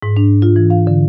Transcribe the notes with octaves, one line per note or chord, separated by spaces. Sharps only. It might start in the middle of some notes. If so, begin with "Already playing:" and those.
G#2
D4
F4
E3
F5
D3